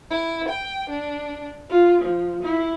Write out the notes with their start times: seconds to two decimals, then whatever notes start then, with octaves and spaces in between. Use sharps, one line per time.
0.10 E4
0.47 G5
0.89 D4
1.68 F4
2.00 F3
2.42 E4